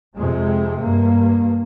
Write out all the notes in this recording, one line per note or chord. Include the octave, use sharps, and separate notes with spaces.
F2 C3 G#3
G2 A#3